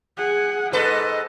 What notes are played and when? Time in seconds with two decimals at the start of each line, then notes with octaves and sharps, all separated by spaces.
0.17 G#4 F#5
0.73 G#2 A4 B4 D#5